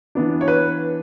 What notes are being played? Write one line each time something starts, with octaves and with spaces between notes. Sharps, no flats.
E3 B3 D4
C#5
B4